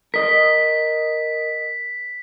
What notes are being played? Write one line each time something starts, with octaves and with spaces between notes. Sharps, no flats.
A#4 D#5 B6